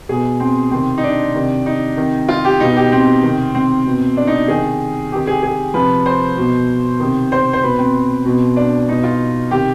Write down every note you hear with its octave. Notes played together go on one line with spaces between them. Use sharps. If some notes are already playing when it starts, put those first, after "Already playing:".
B2 G#4
C4
C3 D#3 C4
D#4
D4
C3 D#3
D#4
C3 D#3
F4
G4
B2 D#4
G4
C4
C3 D#3
C4
B2
D4
D#4
C3 D#3 G#4
C3 D#3 G4
G#4
G#4
C3 F3 B4
C5
B2
C3 D#3
C5
C5
B2 B4
C4
B2
D4
B2 D#4
F4
C3 D#3 G4